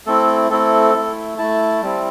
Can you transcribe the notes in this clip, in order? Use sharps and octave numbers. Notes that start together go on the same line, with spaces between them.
A3 C4 E4 A4
A3 C4 E4 A4
A3 E4
A3 E4 A5
G3 C4 E4